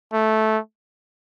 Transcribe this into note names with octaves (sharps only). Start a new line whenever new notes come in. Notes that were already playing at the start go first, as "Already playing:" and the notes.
A3